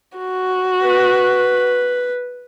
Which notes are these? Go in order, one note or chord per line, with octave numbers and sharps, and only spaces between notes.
F#4
B4